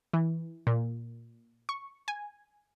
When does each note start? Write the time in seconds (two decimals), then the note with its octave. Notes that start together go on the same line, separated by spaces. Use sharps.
0.13 E3
0.67 A#2
1.69 C#6
2.08 G#5